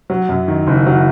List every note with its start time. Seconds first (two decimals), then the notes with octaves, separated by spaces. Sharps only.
0.10 F#3
0.29 F#2
0.48 D#3
0.67 F#1
0.86 F#3